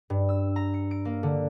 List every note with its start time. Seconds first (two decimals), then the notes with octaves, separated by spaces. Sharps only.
0.10 G2
0.29 E6
0.56 A#5
0.74 C#7
0.91 D7
1.05 A#3
1.23 D3